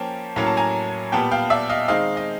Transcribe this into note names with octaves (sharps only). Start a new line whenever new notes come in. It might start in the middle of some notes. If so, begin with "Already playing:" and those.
Already playing: F3 A#3 C#4 G5 A5
A2 F#3 A#3 C#4 A#5
A5
G#5 A#5
A#2 G3 B3 G5 A5
F5 G5
D5 E5
D#5 F5
D#3 G#3 C4 D#5 F5
D#5